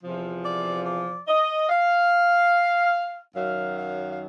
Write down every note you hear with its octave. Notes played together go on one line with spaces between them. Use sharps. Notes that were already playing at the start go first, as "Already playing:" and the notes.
E2 C3 F3
D5
D5
D#5
F5
F#2 D#3 F#3 F5
F5
F5